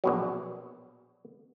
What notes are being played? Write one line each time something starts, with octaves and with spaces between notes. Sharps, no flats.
A#1 B2 F#3